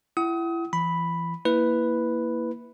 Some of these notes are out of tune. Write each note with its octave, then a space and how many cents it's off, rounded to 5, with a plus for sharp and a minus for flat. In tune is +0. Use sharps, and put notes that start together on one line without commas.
E4 +30 F#5 +40 D#6 +30
E3 +30 B5 +0
A#3 +0 E4 -5 B4 +0